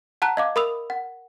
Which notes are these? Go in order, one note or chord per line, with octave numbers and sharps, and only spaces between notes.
F#5 A5 A#5 F#6
D#5 F5 D6
A#4 B5 D#6 E6 F7
F#5